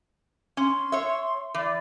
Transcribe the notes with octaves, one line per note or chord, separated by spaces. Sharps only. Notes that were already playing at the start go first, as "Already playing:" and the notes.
C#4 C6
C#5 E5
E3 D5